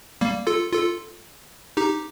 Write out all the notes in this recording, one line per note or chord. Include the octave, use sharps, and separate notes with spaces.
G3 A#3
F4 A4
F4 A4
D#4 G4